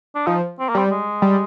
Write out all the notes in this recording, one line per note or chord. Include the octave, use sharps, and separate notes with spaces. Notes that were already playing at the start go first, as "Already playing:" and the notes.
D4
F3 D#4
C4
A#3
G3 C4
G#3
G3